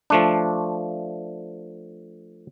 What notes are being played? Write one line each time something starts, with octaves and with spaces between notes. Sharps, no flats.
F3 A3 D4